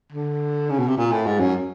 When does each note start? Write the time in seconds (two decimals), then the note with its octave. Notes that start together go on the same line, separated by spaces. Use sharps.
0.12 D3
0.70 C#3
0.79 B2
0.88 C3
0.98 A#2
1.12 A2
1.26 G#2
1.40 F#2